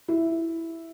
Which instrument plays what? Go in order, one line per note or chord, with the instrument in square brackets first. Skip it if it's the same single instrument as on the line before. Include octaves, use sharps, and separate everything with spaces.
[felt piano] E4